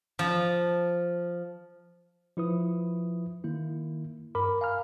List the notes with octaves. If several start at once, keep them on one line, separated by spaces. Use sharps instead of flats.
F3
F3 E4 B4 D#6
D#3 A#3 E4
G2 A#4 B5 D6
F5 G#5 A#5 B5 F6